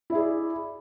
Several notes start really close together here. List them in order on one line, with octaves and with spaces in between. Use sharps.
E4 E5 G#4 D5